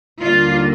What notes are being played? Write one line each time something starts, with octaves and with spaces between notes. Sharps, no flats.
D#2 D3 G3 A#3 F4